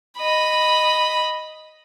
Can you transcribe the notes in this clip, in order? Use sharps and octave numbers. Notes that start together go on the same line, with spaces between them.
D#5 B5